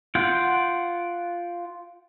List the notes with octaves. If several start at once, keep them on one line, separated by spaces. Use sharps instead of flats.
F4 F#5 G5